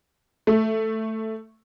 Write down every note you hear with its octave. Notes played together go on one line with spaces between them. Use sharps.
A3